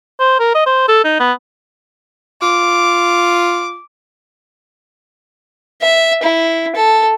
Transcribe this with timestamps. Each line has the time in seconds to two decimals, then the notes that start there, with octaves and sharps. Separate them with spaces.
0.20 C5
0.39 A#4
0.54 D#5
0.66 C5
0.88 A4
1.05 D#4
1.20 B3
2.42 F4 D6
5.81 E5
6.23 E4
6.76 A4